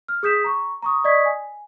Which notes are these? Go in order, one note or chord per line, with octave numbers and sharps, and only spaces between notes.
F6
G#4 D#6 G6 B6 E7
A#5 C#6
A#5 C#6 D#6
D5 D#5 C#6 D#6 G#6 B6
G#5